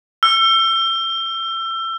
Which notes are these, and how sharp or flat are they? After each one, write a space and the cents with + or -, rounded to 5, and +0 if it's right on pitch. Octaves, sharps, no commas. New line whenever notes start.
E6 +25